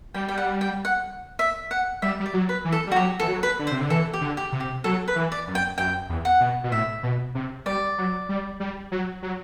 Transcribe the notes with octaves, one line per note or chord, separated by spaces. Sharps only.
G3 G5
G5
F#5
G5
F#5
E5
F#5
G3 E5
G3
D5
F#3
B4
E3
A4
G3
F#4
F#3 G4
E3 A4
F#3
B4
D3
C5
C3
D3
E3 A4
G4
D3
G4
C3
G4
F#3 A4
B4
E3
D5
F#2
G5
F#2 G5
E2
F#5
B2
B2
A2 E5
B2
C3
G3 D5
F#3
G3
G3
F#3
F#3